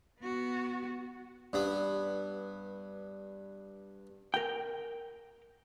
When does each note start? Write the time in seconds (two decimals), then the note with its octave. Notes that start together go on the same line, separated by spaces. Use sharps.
0.20 B3 F#4
1.53 G2 B3
4.34 A#4 G5